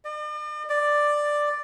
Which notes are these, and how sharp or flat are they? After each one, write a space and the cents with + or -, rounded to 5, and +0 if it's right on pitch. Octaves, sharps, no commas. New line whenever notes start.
D5 +45
D5 +5